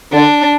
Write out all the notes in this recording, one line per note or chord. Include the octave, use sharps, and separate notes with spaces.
D3 D4